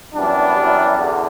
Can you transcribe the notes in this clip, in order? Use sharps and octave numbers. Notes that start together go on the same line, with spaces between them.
F#2 E3 G3 B3 D4
F#2 E3 G3
E2 D3